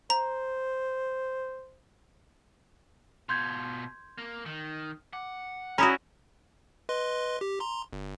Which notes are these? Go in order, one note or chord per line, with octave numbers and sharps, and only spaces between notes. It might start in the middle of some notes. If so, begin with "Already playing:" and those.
C5 A#5
B2 F4 C6 G6 G#6
A#3
D#3
F#5 D6
G3 C#4 E4 F#4 D5 A#5 B5 D#6
B4 D#5 C6
G4
A#5 C6
G1